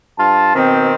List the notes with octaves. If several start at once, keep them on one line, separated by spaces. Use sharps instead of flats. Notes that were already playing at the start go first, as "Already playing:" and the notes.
G2 F4 A5
B2 D#3 C4